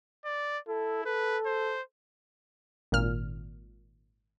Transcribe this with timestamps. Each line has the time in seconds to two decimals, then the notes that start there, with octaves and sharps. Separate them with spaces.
0.25 D5
0.68 E4 A4
1.05 A4 B4
1.45 C5
2.92 G#1 A#2 F6